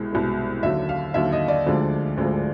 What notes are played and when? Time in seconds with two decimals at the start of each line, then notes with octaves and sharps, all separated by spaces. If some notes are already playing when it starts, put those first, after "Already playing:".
Already playing: C2 B2 G#3
0.13 C2 B2 G#3
0.63 D#2 D3 F#3 E5
0.89 F5
1.14 D#2 D3 F#3 E5
1.32 D#5
1.48 D5
1.66 D2 D3 F3 G#3
2.17 D2 D3 F3 G#3